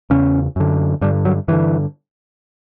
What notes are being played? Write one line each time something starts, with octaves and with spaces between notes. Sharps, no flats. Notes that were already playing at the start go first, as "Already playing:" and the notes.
E2 C#3 C#4
F#2 D3
G2 D3 G3
F#3
G2 D3 E3